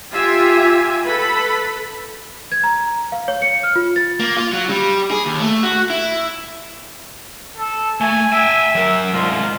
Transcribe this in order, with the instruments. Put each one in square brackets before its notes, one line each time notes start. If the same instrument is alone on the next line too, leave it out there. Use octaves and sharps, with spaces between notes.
[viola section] F4 G4 E5 G#5
A4 B4 B5
[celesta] G#6
A#5
F5
C#5
C#7
F6
F4
A6
[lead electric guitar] A#3
F4
F#3
G3
G#4
D#2
A3
F#4
E4
[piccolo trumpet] A4
[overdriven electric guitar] A3 [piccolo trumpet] G#5
[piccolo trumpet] E5 [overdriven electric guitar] G5 G#5
[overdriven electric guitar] F#3 A#4
[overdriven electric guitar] C2 G#2 [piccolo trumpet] F4